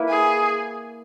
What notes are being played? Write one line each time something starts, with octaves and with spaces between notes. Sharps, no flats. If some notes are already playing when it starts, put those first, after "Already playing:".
Already playing: A#3 E4 B4
G#4